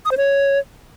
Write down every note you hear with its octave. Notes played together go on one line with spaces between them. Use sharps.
D#6
C5
C#5